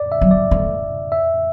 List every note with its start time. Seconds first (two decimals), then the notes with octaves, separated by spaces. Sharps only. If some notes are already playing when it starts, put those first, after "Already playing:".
Already playing: D5
0.12 E5
0.21 F#3
0.31 D5
0.51 A3
1.12 E5